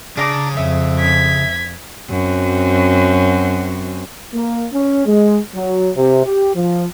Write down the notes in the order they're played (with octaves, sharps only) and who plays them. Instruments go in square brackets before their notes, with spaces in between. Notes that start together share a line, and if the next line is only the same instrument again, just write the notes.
[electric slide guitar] C#3 G#4 [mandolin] D4 A#5 D6
[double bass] F2 [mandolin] E5
[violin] G#6 B6
[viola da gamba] F#2 F#3 C4
[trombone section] A#3
C#4
G#3
F#3
C3
G4
F3